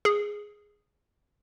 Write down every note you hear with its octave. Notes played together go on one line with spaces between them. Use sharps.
G#4